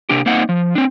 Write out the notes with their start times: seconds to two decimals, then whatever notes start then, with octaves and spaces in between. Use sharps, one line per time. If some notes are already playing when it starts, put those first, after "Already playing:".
0.09 C3 D4 G4
0.26 A#3 C4 D#4 F#5
0.49 F3
0.75 C4 D4